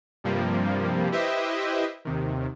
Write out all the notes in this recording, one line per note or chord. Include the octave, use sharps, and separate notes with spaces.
G2 C3 F3 G3 A#3
E4 G4 B4 C5 D#5 E5
D#2 C3 D#3